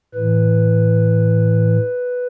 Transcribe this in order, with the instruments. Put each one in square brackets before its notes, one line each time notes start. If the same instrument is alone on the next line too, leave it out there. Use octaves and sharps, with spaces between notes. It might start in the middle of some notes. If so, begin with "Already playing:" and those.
[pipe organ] A2 E3 B4